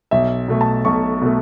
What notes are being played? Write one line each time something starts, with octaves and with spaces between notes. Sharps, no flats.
B1 E5
B2 A3
A5
B1 C#6
B2 A3